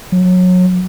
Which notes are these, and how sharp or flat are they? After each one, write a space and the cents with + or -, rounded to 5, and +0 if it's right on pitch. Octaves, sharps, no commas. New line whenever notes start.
F#3 -25